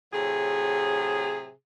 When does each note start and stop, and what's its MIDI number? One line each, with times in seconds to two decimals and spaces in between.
0.13 1.52 45
0.13 1.52 48
0.13 1.52 54
0.13 1.52 68